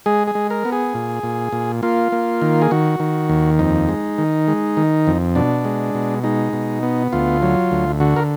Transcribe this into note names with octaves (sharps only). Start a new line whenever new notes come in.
G#3 G#4
G#4
G#3
A#4
B3
G#4
A#2
A#2
A#2
A#3 F4
A#3
D#3
G#4
D#3 F#4
D#3
D#2
F2 D#4
G#3
D#3
G#3
D#3
F2
B2 D4
G#3
B2
G#3 D#4
B2
B3
D2 F4
F#3
D2
D3 F#4
A#4